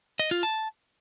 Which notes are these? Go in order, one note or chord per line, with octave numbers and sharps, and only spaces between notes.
D#5
F4
A5